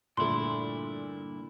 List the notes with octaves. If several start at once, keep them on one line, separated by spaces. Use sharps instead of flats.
G2 A#2 D3 A3 E4 C6